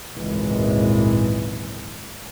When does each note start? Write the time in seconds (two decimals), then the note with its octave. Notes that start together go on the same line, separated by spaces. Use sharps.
0.14 G#1 C#2 F#2 A#2 E3 G#3